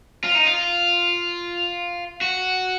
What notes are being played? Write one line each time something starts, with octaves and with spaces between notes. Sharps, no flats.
F4
D#4
F4
F#4